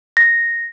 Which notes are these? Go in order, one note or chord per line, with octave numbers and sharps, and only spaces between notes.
A#6